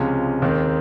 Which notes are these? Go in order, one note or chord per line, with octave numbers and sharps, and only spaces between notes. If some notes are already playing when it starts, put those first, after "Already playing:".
Already playing: C#2 C3 F3 G#3 C#4
D#2 D#3 G#3 C4